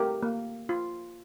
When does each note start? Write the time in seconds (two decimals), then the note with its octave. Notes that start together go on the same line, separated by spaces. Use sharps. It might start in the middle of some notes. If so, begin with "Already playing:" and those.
Already playing: A3 G4 A#4
0.23 A#3
0.69 F4